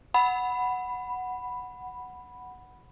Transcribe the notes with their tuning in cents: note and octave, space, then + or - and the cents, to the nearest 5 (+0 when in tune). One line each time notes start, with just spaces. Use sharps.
F#5 +0 B5 +0